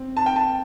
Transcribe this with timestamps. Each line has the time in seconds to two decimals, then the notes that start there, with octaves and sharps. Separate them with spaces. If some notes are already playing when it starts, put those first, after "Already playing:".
Already playing: C4
0.17 A5
0.26 G5
0.36 A5